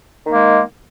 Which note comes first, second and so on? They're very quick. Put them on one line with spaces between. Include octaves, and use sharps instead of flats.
D#3 A#3 G#3